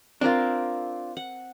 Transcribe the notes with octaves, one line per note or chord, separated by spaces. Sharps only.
C4 D4 F4 A#4
F#5